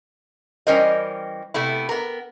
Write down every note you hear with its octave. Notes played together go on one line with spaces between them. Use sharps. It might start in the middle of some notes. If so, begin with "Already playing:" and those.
E3 G3 C#4 A#4 C5 D#5
C3 A3 B3 E4
B3 A#4